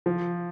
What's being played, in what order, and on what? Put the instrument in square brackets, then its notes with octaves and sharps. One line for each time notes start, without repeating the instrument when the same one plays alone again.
[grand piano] F3